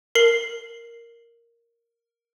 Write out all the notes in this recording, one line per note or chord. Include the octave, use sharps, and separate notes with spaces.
A#4 C7 F#7